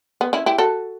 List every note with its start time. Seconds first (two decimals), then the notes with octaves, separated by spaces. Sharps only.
0.21 B3
0.33 C#4 E4
0.46 E4 G4
0.58 F#4 A4